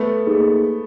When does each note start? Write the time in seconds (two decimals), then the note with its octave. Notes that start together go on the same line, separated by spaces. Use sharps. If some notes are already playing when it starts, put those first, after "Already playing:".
Already playing: A3 B3
0.27 A#3 D#4 G#4